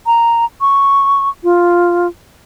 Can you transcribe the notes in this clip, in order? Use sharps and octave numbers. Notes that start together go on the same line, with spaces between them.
A#5
C#6
F4